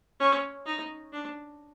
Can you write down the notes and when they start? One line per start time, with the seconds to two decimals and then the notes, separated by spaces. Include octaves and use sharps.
0.20 C#4
0.66 D#4
1.13 D4